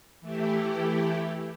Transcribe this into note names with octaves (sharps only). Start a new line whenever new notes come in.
E3 A3 E4 G4